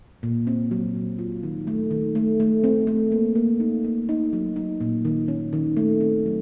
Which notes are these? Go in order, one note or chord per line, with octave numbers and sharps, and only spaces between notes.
A#2
C4
F#3
A#2
F4
D#3
A3
D#3
A3
A3
C4
A3
A#3
A#3
D#4
A#3
D#4
F#3
D#4
A#2
D#3
C#4
D#3
A3
C4
F#3